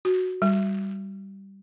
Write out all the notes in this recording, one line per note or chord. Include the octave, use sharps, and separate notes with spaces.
F#4
G3